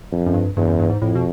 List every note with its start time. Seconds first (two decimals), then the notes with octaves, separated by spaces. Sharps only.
0.12 F2
0.26 F#2
0.34 G2
0.57 E2 G2
0.67 F#2
0.79 G2
0.90 G#2
1.02 F2 A2
1.15 B2